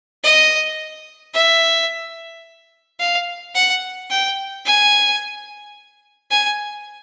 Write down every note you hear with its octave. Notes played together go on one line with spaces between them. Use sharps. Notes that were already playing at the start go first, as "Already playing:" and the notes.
D#5
E5
F5
F#5
G5
G#5
G#5